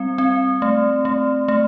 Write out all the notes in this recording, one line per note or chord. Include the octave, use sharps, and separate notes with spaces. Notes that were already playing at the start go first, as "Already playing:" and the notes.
Already playing: G3 C4
C4
A3
A3
A3